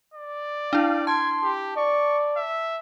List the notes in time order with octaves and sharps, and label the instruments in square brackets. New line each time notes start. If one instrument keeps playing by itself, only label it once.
[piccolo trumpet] D5
[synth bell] D4 E4 [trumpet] F5
[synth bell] A5 [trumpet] C6 [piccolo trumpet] G#6
[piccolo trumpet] G4
[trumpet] D5 [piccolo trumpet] C#6
[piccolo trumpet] E5